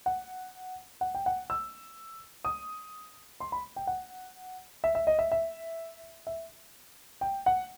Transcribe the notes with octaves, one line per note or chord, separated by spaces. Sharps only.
F#5
F#5
G5
F#5
E6
D#6
C6
B5
G5
F#5
E5
E5
D#5
E5
E5
E5
G5
F#5